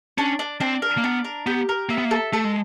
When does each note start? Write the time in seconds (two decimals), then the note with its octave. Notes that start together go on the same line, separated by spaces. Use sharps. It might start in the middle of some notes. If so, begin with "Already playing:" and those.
0.18 C#4 D4
0.39 D4
0.60 C4 D4
0.82 A#4
0.98 A#3
1.04 B3 D4
1.25 A#4
1.46 B3 G4
1.69 A#4
1.89 A#3 E5
1.98 B3
2.05 A#3
2.11 A4
2.33 A3 A4
2.45 G#3